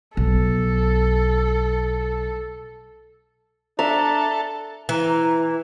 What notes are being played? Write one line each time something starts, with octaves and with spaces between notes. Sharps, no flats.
B1 A4
D4 A4 E5 A#5
E3 A#5